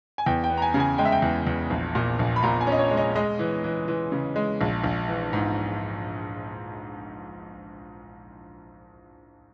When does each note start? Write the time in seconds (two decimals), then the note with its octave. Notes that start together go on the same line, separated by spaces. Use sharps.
0.18 G#5
0.26 E2 G5
0.44 G5
0.50 B3
0.57 A#5
0.62 G#5
0.74 C#3
0.80 G#5
0.98 G#3 G5
1.05 E5
1.12 G5
1.22 E2
1.47 E2
1.70 A#1
1.95 A#2
2.19 A#1
2.36 B5
2.43 A#2 A#5
2.61 G#5
2.67 C#4 D#5
2.79 C#5
2.91 G#3
2.97 D#5
3.15 G#3 D#5
3.39 E3
3.64 E3
3.88 E3
4.12 C#3
4.36 G#3
4.61 A#1
4.84 A#1
5.08 E3
5.33 G#2